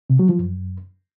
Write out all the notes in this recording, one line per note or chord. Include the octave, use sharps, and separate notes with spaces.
C3
F#3
F3
F#2